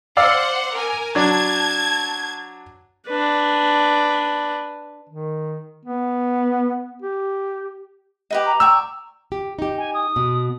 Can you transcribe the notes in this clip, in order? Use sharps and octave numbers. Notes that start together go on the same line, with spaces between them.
C5 D5 F5 F#5 E6
A#4 G#5
F#3 D4 A5 G#6
D4 B4
D#3
B3
G4
G4 B4 D#5
A#5
D5 G5 C#6 E6
G4
D#4 G4
G#5
D#6
B2